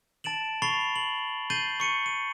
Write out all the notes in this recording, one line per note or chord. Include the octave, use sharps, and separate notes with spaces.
A5 A6 D7 E7 F#7
B5 C#6 A6 C7 F7 G7
F#7
G6 A6 C7 D#7 F#7 G7
C#6 C#7 D#7
D#7